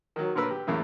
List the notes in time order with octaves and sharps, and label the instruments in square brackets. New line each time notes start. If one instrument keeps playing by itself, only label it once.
[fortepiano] D#3 F#3
A#2 D3 A#4 B4 E6
G4
E2 A2 C#3 A#3